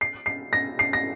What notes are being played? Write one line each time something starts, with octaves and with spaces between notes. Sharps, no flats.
C7
C7
A#6
C7
A#6